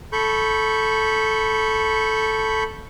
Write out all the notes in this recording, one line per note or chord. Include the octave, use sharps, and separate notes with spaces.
A4 B5 C#6 G6